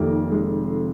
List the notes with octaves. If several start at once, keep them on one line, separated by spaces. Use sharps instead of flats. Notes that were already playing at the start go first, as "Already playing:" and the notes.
Already playing: F1 F2 C3 D#3 A#3
G#3